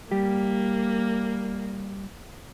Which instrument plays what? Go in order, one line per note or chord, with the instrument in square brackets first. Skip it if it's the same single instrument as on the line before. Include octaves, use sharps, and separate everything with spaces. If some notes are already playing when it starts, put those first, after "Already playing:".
[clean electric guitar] G3 G4 [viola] A#3